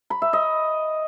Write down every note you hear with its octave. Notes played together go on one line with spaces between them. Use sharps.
B5
E5
D#5